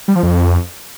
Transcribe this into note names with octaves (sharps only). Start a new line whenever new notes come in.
G3
F3
F2